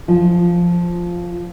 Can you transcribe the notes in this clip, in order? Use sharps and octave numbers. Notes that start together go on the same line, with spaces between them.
F3